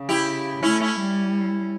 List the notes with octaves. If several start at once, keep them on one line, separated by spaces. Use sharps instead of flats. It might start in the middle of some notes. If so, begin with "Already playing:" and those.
Already playing: C#3
E4 G4
A3 C#4 E4
C#4 E4
G3